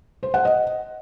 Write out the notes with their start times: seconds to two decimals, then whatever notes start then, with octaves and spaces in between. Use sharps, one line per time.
0.23 C5
0.34 F#5
0.45 D#5